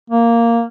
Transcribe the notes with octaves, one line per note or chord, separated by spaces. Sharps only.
A#3